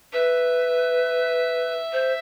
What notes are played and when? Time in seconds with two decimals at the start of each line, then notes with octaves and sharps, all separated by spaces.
0.13 B4 E5
1.92 C5